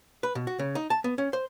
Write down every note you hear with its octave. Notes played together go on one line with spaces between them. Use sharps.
B4
B2
F#4
C#3
D#4
A5
B3
C#4
C5